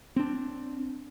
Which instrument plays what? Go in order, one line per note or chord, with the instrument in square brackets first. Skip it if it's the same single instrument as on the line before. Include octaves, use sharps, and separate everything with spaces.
[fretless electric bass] C4 D4